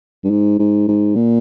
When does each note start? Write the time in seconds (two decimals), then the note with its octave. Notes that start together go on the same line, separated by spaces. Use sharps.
0.24 G2
0.31 G#2
0.59 G#2
0.88 G#2
1.16 A#2